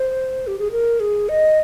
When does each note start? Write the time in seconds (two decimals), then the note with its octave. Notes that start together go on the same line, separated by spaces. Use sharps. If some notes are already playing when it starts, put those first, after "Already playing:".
Already playing: C5
0.47 G4
0.59 G#4
0.71 A#4
1.00 G#4
1.29 D#5